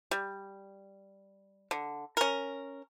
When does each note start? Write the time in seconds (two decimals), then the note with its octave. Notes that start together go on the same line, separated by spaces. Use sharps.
0.11 G3
1.71 D3
2.17 C#4 A#4